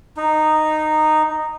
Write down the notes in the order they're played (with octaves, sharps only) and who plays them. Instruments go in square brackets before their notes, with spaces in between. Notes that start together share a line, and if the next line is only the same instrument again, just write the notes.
[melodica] D#4